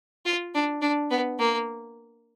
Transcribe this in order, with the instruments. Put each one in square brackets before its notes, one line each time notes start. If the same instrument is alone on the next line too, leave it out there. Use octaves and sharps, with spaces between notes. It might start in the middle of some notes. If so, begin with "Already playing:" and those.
[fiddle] F4
D4
D4
B3
A#3